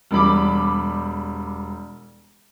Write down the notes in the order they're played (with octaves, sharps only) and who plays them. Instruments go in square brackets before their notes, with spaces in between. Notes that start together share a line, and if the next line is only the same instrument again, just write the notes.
[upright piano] E1 G3 B5 D6